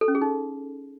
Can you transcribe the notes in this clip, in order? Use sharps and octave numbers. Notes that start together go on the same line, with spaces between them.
A4
C#4
G#4
D#4